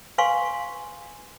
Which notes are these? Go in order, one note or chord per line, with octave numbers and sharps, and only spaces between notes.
B4 F5 G#5 C6 C#6